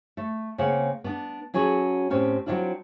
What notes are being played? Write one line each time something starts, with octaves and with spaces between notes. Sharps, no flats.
A3
C#3 A#3 C4 F#5
B3 D4
F#3 C#4 F#4 G#4 A4 B4
A2 C4 C#4 G4
F#3 G3 C4 D4 E4 F4